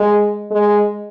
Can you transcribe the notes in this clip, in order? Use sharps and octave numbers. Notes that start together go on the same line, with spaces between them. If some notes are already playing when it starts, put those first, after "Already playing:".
Already playing: G#3
G#3